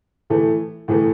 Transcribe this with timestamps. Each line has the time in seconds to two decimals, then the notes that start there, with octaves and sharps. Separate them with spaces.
0.30 A2 E3 A3
0.88 A2 E3 A3